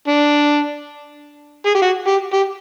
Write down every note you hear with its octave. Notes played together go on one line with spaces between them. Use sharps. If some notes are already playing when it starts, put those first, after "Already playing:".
D4
G#4
G4
F#4
G4
G4